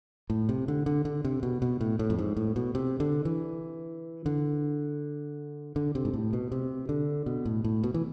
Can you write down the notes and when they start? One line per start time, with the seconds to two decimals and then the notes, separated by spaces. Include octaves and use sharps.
0.30 A2
0.49 C3
0.68 D3
0.86 D3
1.05 D3
1.25 C3
1.43 B2
1.62 B2
1.81 A2
1.99 A2
2.10 F2
2.18 G#2
2.36 A2
2.56 B2
2.75 C3
3.00 D3
3.25 E3
4.26 D3
5.76 D3
5.95 C3
6.05 G#2
6.14 A2
6.33 B2
6.52 C3
6.89 D3
7.26 B2
7.45 A2
7.64 A2
7.83 B2
7.94 E3